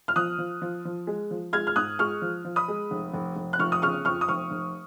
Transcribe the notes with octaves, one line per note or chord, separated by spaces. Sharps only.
F6
F3 D#6 F#6
F3
F3
F3
G#3
F3
G#3 F6 G#6
F6
G#2 D#6 F#6
G#3 C#6 F6
F3
F3
B5 D#6
G#3
F1
F1
F1
F#6
F1 C#6 F6
D#6
C#3 C#6 F6
F2 C#6 F6
D#6
F1 C#6 F6
F1